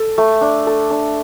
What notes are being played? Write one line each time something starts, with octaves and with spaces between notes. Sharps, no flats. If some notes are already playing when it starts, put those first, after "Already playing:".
Already playing: A4
A3
D4
A4
D4